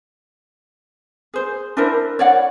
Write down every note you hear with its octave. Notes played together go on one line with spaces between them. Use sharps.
G#4 C5
D4 E4 A#4 C5
C#5 D5 F#5